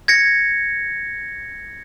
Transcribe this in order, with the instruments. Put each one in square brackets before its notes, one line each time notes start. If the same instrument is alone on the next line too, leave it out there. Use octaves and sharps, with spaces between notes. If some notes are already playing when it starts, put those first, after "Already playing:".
[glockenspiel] G#6 A#6 C#7